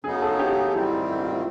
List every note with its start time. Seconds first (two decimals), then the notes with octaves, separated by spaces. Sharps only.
0.04 F#2 C#3 F#3 B3 D#4 G#4
0.22 A4
0.39 G4
0.56 G#4
0.74 G#2 D#3 G3 C4 E4
0.91 E4
1.09 E4
1.20 F4
1.32 E4